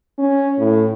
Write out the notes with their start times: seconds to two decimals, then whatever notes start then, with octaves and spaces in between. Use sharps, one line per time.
0.18 C#4
0.58 A2